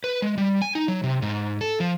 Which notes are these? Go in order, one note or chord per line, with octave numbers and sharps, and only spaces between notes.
B4
G#3
G3
G#5
D#4
F#3
C3
G#2
A4
F3